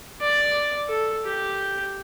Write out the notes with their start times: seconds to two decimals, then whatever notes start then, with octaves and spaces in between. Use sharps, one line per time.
0.21 D5
0.89 A4
1.25 G4